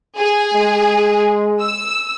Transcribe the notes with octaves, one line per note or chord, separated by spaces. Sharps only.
G#4
G#3
E6